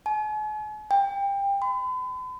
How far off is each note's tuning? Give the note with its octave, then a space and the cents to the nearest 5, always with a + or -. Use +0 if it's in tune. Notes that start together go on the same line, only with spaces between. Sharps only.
G#5 +45
G5 +25
B5 +45